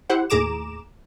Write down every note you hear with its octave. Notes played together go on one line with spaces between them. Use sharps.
E4 G4 C5 F#5
D#2 A2 G#4 A#5 D6 E7